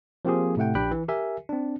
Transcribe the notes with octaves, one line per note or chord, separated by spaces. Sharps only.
F3 A#3 C4 F4 G4 G#4
A2 C3 A3 F#5 G5
A#1 D4 G4 G5 B5 F#6
E3
G4 A#4 E5 G#5
C4 D4